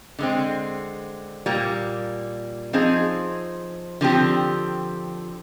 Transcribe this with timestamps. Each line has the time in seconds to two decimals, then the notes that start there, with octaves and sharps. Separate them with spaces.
0.19 D3 G#3 C4
1.46 A#2 G3 A#3
2.73 F3 C4 D#4 G#4
4.01 D3 F3 C4 G4